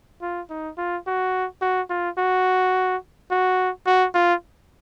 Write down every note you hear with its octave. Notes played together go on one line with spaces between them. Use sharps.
F4
D#4
F4
F#4
F#4
F4
F#4
F#4
F#4
F4